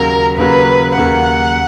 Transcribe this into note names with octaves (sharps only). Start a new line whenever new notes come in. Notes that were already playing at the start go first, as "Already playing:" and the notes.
Already playing: D#2 C#3 F#3 A#3 A#4
D#2 C#3 F#3 A#3 B4
D#2 C#3 F#3 A#3 F#5